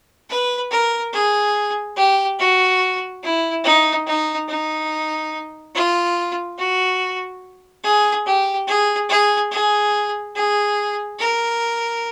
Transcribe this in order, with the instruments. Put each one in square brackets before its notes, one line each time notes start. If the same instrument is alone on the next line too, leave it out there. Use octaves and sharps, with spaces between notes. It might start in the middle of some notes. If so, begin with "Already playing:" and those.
[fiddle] B4
A#4
G#4
G4
F#4
E4
D#4
D#4
D#4
F4
F#4
G#4
G4
G#4
G#4
G#4
G#4
A#4